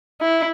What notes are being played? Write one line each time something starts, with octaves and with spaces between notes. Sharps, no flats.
E4